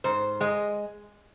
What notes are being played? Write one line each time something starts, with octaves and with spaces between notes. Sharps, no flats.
G#2 C5
G#3 D#5